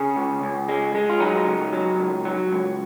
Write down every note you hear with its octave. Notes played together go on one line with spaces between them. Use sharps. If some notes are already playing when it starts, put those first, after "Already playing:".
Already playing: C#3 C#4
C#2
C#2
G#3
G#3
F4
F#3 D#4
C#2
F#3
C#2
F#3
C#2